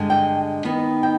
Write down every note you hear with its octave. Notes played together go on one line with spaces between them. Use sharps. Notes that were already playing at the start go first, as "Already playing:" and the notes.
Already playing: G2 D3 G#3
G5
D#3 B3 D#4
G5